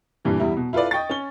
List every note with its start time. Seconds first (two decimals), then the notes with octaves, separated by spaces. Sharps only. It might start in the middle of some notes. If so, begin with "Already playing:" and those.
0.25 G2 A#2 E3 G3
0.40 E2 G3 E4
0.57 B2
0.73 E4 F4 A4 B4 D5
0.91 D#5 G5 C#6 A6
1.10 C#4 G7